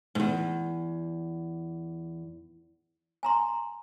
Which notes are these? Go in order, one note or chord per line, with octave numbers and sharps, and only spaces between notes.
E2 G#2
G#5 A#5 C6